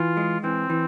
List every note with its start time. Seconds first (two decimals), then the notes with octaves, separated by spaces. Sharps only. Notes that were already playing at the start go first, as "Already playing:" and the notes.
Already playing: E3 F4
0.17 G#3
0.43 E3 C4
0.70 E3